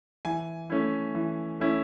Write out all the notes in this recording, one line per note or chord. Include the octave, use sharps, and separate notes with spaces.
E3 G#5
A3 C#4 E4
E3
A3 C#4 E4